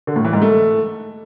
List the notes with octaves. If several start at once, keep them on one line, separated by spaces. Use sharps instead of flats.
D3
A2
E3
G#2
A3